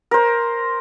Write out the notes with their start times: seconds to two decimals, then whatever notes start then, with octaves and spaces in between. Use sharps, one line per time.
0.11 A#4 C5